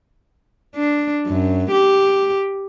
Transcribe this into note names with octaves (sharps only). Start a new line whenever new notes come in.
D4
F#2
G4